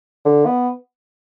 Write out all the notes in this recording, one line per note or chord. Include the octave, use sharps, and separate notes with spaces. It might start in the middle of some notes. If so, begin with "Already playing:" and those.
D3
B3